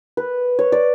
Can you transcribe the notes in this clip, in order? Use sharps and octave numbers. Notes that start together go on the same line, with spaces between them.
B4
C#5
D5